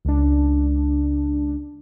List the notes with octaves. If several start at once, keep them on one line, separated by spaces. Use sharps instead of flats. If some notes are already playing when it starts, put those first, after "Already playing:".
C#2 D4